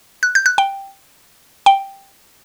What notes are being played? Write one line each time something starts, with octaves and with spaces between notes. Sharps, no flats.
F#6
G6
F#6
G5
G5